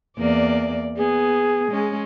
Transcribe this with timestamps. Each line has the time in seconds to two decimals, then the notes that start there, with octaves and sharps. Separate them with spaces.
0.18 E2 A#3 D5
0.97 B3 G#4
1.71 G#3 C#4